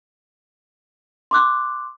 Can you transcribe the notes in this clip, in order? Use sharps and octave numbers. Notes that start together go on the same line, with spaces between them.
C6 D6 F#6